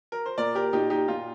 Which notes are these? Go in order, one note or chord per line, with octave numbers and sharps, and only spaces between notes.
A#4
C5
A#2 A#4 D5
G4 A#4
A#2 D#4 G4
D#4 G4
A#2 F4